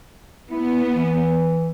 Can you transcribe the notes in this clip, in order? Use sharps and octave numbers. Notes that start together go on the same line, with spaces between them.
B3 E4
E3